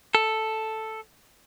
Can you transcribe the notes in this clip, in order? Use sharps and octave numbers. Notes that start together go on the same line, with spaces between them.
A4